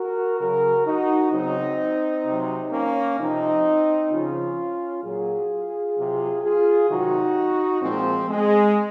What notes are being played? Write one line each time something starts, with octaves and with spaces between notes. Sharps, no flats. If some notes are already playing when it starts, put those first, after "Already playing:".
Already playing: F#4 A#4
C#3 F#3 F#4 A#4
D#4 F#4
C#3 F#3 C4 D#4
C3 F#3
A#3 C#4
C3 F3 C4 D#4
C#3 F3 C#4 F4
A#2 F#3 F4 G#4
C3 F#3
F4 G#4
C3 D#3 F#3 D#4 F#4
A#2 F3 G#3 C4
G#3